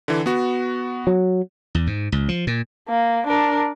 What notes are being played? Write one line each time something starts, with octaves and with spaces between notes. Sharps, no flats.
D3 E3
B3 F#4
F#3
E2
G#2
C#2
F3
A#2
A#3
D4 A#4